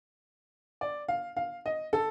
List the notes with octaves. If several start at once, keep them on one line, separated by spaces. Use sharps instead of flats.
D5
F5
F5
D#5
A4